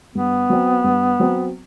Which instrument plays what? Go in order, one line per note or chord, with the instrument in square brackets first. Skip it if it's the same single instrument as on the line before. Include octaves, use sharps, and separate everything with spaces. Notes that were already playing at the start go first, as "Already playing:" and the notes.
[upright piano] G2 [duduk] B3
[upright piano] F#3 C4
G2
F#3 C4